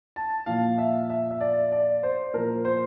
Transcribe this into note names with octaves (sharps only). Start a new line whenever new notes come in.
A5
A#2 F3 F5
E5
E5
E5
D5
D5
C5
A#2 F3 A#4
C5